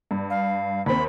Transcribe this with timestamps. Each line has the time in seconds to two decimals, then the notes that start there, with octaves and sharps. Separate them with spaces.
0.11 G2
0.30 F5
0.86 D#2 C4 B5